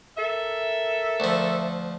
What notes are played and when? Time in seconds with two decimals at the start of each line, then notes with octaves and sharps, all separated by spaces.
0.17 A4 A#4 E5
1.20 D2 F3